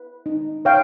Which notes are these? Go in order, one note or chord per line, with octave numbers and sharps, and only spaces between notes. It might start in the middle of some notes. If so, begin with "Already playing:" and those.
Already playing: B4
D#4
C#5 F5 G5